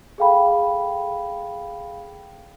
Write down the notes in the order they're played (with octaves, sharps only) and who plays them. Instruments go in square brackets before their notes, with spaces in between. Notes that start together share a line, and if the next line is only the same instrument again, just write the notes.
[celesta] G#4 A4 F5 G5 B5